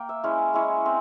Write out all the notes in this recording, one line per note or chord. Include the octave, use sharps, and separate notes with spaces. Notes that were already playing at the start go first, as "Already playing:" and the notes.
Already playing: A#3 G5
E5
G#3 C#4 E4
G#3 C#4 E4
C4 E4